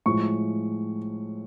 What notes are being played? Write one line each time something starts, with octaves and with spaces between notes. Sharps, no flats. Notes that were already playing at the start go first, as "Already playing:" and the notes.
A2 F3 G#3 C#6